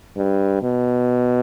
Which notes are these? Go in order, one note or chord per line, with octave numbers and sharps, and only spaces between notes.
G2
B2